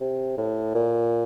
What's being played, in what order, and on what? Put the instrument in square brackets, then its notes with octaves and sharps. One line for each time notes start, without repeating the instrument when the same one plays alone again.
[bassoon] C3
A2
A#2